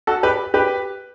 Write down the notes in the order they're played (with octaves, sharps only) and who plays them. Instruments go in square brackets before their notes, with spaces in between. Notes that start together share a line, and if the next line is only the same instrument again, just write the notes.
[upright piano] F#4 A4
G4 B4
G4 B4